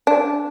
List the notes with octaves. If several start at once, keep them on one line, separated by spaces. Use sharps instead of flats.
D4